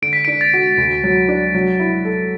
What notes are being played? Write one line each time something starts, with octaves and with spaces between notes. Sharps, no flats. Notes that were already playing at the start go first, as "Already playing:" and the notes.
D3 D7
B6
D4 D7
A6
F#4
D2
F#3
D4
F#3
E4
A4